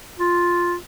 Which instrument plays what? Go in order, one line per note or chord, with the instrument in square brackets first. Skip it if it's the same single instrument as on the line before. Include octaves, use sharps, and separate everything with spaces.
[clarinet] F4